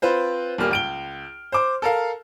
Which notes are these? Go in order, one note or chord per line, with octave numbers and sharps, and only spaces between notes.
C4 F4 B4 C5
D#1 G3 A#3 F6
C#2 D7 G7
C5 D6
A4 A#4 F5